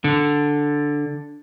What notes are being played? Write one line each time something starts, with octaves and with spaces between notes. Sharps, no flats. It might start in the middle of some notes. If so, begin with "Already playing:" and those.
D3